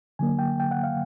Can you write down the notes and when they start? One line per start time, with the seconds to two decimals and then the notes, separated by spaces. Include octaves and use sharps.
0.19 D3 F#3 A#3 G#5
0.39 G5
0.60 G5
0.71 F#5
0.84 F5